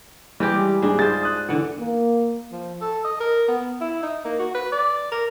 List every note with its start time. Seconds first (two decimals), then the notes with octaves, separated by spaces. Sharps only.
0.40 E3 G3 G#3 G4
0.82 G#2 G3 D4 G#4
0.99 F4 G#4 C5 A6
1.23 D#6 F#6
1.49 D3 E3 F#5
1.79 A#3
2.52 F3
2.81 A4
3.05 D#5
3.20 A#4
3.48 B3
3.81 E4
4.03 D#4
4.25 A#3
4.39 F#4
4.55 B4
4.72 D5
5.12 A#4